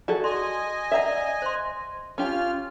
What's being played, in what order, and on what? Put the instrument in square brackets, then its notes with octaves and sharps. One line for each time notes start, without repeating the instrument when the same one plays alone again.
[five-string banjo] F#4 G#4 A4 [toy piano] D5
[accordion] D#5 G#5 [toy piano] C6
[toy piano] A#4 D5 F#5 [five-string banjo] E5 A#5
[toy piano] C5 C6
[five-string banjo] C#4 G4 [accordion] F4 F6